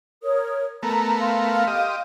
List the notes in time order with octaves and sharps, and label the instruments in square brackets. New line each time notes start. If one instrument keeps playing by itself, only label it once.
[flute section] A#4 C#5 D#6
[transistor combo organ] A3 B3 A#4 [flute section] A#5
[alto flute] F5 [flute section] C6
[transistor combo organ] G4 D#5